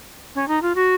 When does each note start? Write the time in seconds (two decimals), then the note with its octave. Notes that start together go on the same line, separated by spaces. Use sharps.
0.35 C#4
0.48 D#4
0.62 F4
0.75 F#4